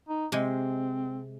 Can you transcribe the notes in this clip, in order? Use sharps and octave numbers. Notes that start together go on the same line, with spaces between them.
D#4
C3 G#3 C4